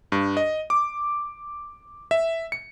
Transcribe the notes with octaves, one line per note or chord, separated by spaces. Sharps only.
G2
D#5
D6
E5
C#7